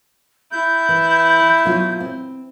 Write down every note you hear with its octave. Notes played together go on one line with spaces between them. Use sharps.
E4 G6
E3
B2 F#3 F4
C4